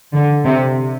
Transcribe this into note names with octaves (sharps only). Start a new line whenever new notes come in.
D3
C3